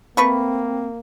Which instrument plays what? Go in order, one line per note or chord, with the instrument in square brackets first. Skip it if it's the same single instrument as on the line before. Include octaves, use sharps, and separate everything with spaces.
[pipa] A3 B4 C#6 [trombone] A#3 [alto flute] C4